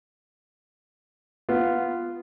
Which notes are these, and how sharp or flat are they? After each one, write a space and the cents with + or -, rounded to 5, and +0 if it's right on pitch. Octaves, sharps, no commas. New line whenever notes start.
B3 +0 F4 -10